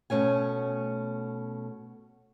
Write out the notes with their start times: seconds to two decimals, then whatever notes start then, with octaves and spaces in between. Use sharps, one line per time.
0.10 B2 A3 C#4 G#5